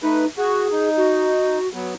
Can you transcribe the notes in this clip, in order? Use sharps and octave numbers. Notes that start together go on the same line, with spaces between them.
A3 D#4 B4
F#4 G#4
D#4
F#4
F#3 B3